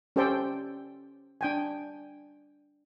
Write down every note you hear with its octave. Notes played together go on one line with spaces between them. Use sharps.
C#4 G4 A4 C5 D5 G5
D4 G5 G#5